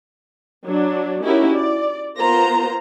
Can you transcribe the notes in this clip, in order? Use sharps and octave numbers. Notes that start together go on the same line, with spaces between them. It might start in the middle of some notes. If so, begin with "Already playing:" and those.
F#3 D4
C#4 D#4 E4 F#4 G4 A#4
D5
B3 F4 A#4 C5 A#5